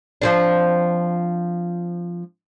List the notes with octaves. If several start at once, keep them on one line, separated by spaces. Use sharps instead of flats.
F3 C4 D4